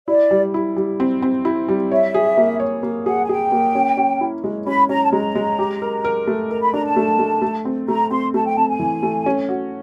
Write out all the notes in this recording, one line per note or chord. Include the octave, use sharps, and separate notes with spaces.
E4 D5
G3
E4
G3
C4
C4
E4
G3
C#5 E5
G#4
A#3
C#5
A#3
G#4 F#5
G#5
G#4 G5
A#3
C#4
C#4
E4
G#3
C#4 B5
C#4 A#5
A5
G#3 A#5
G#3
G4
A#4
A#4
A3
A#4 A#5
B5
D4 A#5
A5
A3
A3
A3
C4
A3 A#5
C4 C6
A3 A5
G5
C4 A5
G#5
E3
A3
C#4
F#4